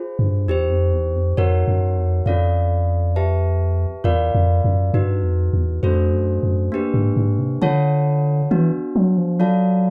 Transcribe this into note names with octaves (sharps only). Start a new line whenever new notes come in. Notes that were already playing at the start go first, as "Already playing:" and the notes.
Already playing: F4 G#4 C5
G2
E2 D#4 G4 C5
F2
E2
F2
F2 D#4 F#4 A#4 C#5 F#5
F#2
F2
F2 C#4 F4 A4 D5 F5
G4 B4 E5 A5
E2 F4 A#4 D5 F5
F2
F#2
G2 D#4 F#4 B4
F2
E2
F2 A3 D4 F#4 A4 C5
F#2
F#2
A#3 D4 G4 B4
G#2
G#2
C3
D3 F4 A4 C#5 F#5 A5
E3 B3 D4 F#4
F#3
F3
F#3 F4 A4 D5 F5 A5